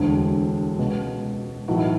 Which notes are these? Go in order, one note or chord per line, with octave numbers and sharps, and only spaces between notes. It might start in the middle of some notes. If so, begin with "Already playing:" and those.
Already playing: E1 D2 D3
C#2 B2
B1 A2 E3 F#4
E4